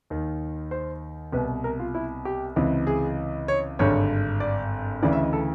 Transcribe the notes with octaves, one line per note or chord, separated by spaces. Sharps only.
D#2 D#3
C5
C2 B2 B4
A#4
F4
E4
G4
C#2 C3 E3
G#4
C#5
G#1 G2 D3 C#5
D5
D2 C#3 E3 D5
E5
D#5
A4